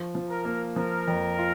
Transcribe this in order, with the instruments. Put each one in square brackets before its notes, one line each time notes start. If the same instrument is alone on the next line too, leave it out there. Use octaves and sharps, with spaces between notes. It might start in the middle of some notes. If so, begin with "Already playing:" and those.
Already playing: [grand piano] F3
F3
[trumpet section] A#4
[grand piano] A#3
[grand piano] F3 [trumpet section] A#4
[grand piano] F2
F4